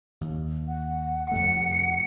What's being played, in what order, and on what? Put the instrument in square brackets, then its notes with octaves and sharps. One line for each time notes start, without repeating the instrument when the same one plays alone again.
[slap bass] D#2
[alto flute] F#5
[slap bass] F2 C3 A3 [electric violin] C#7